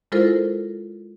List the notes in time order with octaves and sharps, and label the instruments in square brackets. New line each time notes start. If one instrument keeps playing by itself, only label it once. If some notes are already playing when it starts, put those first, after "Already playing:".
[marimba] G#3 E4 F4 A4 A#4 C5